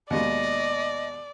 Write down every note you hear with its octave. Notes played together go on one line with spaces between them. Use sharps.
D#2 B2 G#3 D5 D#5